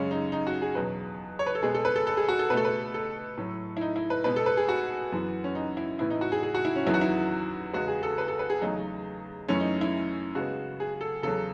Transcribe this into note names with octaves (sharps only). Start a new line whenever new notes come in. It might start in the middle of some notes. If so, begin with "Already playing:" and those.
Already playing: F#2 C#3 G#3 C#4
D#4
D#4
F#4
G#4
E2 B2 F#3 B4
C#5
B4
A4
B2 G#3 B3 G#4
A4
B4
A4
A4
G#4
F#4
A4
B2 A3 A4 B4
B4
A4
A2 F#3 A3
E4
D#4
E4
B4
B2 G#3 B3 B4
A4
B4
G#4
F#4
F#2 E3 B3
C#4
D#4
E4
A2 E3 B3 E4
D#4
F#4
G#4
G#4
F#4
E4
C#4
E2 D#3 F#3 B3 E4
F#4
E4
E2 C#3 G#3 B3 F#4
G#4
A4
B4
A4
B4
G#4
E2 C#3 F#3 A3 D#4
F#2 E3 A3 C#4
D#4
E4
C#3 G#3 B3 F#4
G#4
A4
E2 C#3 F#3 A4